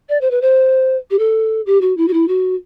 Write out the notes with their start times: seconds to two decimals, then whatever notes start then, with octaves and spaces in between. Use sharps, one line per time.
0.09 D5
0.21 C5
0.31 B4
0.42 C5
1.11 G4
1.19 A4
1.66 G4
1.81 F#4
1.97 E4
2.08 F#4
2.13 E4
2.28 F#4